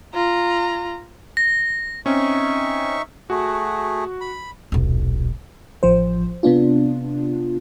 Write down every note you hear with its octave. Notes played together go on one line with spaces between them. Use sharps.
F4 A#5
A#6
C4 C#4 D#4 E5 C#6
A3 F#4 G#4
B5
D#1 B1
A1 F3 C5
C3 B3 D4 F4